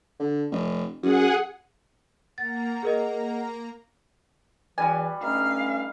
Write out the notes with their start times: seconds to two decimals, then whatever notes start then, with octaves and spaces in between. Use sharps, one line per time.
0.19 D3
0.52 F1
1.03 F#2 G#4 F#5
2.38 A#3 F#5 A#5 A6
2.83 G#4 A#4 D#5
4.78 E2 E3 G3 F#4 G#5
5.22 G2 A3 C#4 D#4 F5